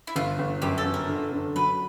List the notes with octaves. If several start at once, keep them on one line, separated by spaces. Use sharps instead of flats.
E4
G1 F4
G1
F#2 G4
A4
G1
A#4
D3
D3
F#3 B4